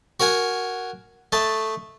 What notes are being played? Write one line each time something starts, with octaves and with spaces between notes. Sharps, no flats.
F#4 A#4 F#5 G#5
A3 D#5 A5